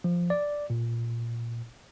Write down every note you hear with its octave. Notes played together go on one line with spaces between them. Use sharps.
F3
D5
A#2